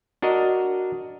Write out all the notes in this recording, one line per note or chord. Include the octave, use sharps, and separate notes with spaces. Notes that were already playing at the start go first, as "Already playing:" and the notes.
D4 F#4 A#4 D#5